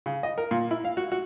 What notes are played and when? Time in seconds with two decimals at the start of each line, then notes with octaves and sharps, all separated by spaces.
0.06 C#3
0.23 D#5
0.38 A#4
0.51 A#2
0.71 E4
0.85 F5
0.97 F#4
1.12 F#4